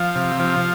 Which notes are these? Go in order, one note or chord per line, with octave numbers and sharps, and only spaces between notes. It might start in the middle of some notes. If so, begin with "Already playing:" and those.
Already playing: F3 F5
C3
F3